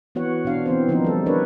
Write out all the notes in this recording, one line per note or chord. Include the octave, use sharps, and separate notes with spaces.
E3 B3 F#4 C#5 F#5
B2 D4 F5
E3 B3 C4 C5
D#3 F3 A#3 B3 D4 D#4
G3 A4
D4 A#4 B4 C#5 D5